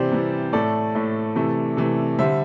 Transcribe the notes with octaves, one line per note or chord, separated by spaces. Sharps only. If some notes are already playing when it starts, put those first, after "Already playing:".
Already playing: C3 E3 G3 G4 C5 D5
C3 E3 G3
A2 A3 A4 D5
A2 A3
C3 E3 A3
C3 E3 A3
D3 G3 C5 E5